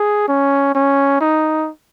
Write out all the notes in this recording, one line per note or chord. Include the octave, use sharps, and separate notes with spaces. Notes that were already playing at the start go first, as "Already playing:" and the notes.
Already playing: G#4
C#4
C#4
D#4